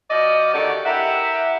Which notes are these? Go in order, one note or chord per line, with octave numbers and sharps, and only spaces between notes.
F3 F#4 D5 D#5
D3 D#3 A3 F#4 G4 D5
E4 G4 A#4 E5 F#5